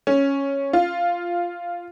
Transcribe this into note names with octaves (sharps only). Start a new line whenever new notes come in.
C#4
F4